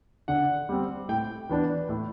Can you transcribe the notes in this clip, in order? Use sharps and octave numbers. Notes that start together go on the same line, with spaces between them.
D3 F#5
G3 C4
A2 G5
E3 B3 D4
A2